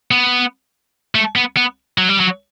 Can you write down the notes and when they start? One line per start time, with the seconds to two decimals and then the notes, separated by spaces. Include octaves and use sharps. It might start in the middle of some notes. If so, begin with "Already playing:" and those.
0.11 B3
1.15 A3
1.36 B3
1.57 B3
1.98 F#3
2.09 G3
2.20 F#3